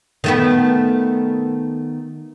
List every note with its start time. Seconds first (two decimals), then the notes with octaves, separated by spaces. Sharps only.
0.24 D#3 A3 B3